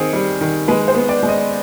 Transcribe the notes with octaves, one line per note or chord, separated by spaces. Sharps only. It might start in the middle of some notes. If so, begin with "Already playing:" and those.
Already playing: D#3 C4 G#4
G3
D#3
G#3 B4
C5
B3
D5
G#3
D#5